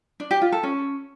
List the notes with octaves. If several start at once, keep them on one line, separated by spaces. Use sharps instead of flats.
D4
G4
F4
A4
C#4